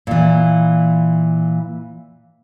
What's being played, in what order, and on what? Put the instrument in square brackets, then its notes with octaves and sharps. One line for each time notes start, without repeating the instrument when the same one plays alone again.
[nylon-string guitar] A#2 E3